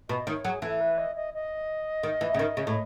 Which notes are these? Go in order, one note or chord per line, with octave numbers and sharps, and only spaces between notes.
B2 D#5
D#3 C#5
F#3 G#4
E3 A4
B4
D#5
D#5
D#5
D#3
E3
C#3
D#3
C#3
A2